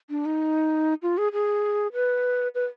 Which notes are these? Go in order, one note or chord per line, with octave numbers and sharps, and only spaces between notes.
D4
D#4
F4
G#4
G#4
B4
B4